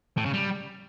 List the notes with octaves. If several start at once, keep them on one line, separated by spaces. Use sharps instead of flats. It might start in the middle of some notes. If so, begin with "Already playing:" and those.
A2
C#3
G3